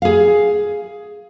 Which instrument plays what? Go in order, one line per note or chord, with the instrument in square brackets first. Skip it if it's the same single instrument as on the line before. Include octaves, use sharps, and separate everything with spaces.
[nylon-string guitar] G#4 F5